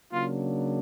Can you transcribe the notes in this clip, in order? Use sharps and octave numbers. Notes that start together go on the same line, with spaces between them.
C#3 F#3 A#3 D4 F4